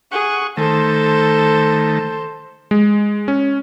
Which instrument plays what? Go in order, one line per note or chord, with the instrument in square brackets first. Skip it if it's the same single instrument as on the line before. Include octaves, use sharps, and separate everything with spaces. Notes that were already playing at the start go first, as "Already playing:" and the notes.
[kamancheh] G#4 [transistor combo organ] F#5 C#6
[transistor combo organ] D#3 A3 [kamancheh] A4 C5
[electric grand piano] G#3
C#4